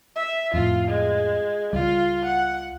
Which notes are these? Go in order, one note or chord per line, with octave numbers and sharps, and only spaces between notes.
E5
F2 A2 F4
G#3
C#2 G3 F4
F#5